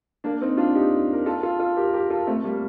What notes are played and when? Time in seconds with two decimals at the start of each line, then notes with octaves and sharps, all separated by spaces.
0.24 A#3 D4
0.41 C4 D#4
0.57 D4 F4
0.75 D#4 G4
1.13 A#4
1.26 F4 A4
1.43 F4 A4
1.60 F4 A4
1.77 G4 A#4
1.94 G4 A#4
2.10 F4 A4
2.27 A3 C4
2.44 G3 A#3